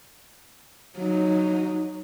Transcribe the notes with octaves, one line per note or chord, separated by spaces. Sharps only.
F#3 D#4